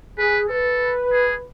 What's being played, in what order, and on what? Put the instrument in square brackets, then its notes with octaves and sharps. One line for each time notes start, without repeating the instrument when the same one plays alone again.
[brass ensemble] G#4 [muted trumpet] B4
[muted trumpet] A4 [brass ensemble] B4
[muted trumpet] G#4